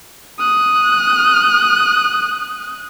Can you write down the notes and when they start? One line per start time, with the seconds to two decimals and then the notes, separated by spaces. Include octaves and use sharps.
0.39 D#6 F#6